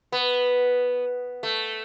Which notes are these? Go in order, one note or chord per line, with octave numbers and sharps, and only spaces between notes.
B3
A3